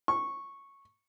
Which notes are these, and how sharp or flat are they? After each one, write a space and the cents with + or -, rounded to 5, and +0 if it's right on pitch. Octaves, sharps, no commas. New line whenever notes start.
C#6 -10